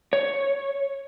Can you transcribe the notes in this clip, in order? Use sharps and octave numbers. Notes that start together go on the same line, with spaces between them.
C#5